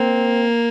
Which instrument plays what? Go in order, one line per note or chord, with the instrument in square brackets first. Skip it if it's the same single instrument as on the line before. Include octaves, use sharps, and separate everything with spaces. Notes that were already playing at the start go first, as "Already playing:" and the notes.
Already playing: [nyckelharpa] A#3 [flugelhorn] C4